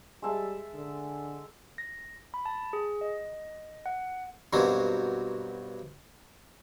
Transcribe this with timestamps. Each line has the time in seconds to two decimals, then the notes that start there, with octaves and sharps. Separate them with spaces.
0.22 G3 G#3 E5 A5
0.74 D3
1.78 A#6
2.34 B5
2.46 A5
2.73 G#4
3.01 D#5
3.86 F#5
4.53 G2 B2 F#3 A#3 C4